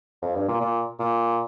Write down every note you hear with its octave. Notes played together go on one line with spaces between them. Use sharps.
F2
G2
A#2
A#2
A#2